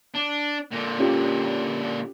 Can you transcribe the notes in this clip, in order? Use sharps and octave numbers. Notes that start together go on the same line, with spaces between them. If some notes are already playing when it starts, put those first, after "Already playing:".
D4
A#2 D3
C#4 F4 G4